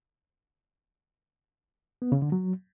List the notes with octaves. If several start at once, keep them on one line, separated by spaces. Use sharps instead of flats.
B3
C#3
D3
F#3